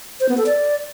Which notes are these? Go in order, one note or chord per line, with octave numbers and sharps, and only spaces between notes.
C5
B3
A4
D5